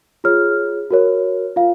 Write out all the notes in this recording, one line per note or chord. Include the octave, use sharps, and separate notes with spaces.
F4 G#4 C#5 F6
F#4 A#4 C#5
F4 F5